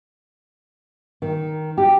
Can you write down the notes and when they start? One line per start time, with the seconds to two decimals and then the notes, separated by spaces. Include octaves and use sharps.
1.22 D#3
1.78 G4